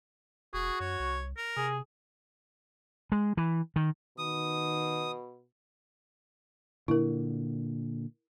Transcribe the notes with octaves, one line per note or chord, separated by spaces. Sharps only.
E1 F#4 G#4
F#2 C#5
C2
A#4
C3 G#4
G#3
E3
D#3
B2 D#3 D#6
A#2 D3 E4 A#4